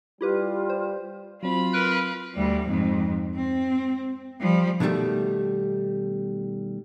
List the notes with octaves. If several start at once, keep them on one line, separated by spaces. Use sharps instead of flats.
G3 E4 F4 G4 B4
C5
F#3 C4 F4 B5
A#4 B4 F#6
D2 G3
F2 G#2
C4
F3 G3
B2 D3 D#3 G3 A3